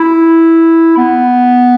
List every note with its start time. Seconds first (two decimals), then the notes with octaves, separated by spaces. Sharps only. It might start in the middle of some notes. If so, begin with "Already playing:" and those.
Already playing: E4
0.98 B3